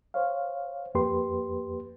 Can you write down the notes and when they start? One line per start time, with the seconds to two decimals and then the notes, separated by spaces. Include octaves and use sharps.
0.14 C5 C#5 F5
0.95 F2 A#3 G4 B4 C6